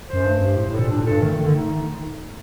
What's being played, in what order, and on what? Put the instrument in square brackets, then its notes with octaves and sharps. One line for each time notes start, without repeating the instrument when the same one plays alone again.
[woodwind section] C5
[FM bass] F#2
[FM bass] G2 [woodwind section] A3
[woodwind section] G4
[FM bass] A2 [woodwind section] C5
[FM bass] A2 [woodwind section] A4
[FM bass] A#2
[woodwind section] D4
[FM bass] A#2
[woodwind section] A4
[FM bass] G2
[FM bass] D#3 [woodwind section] A3
[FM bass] D#3 [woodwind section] A3
[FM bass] D3
[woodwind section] D#4